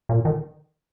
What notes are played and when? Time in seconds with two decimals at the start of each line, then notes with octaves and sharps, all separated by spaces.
0.09 A#2
0.25 D#3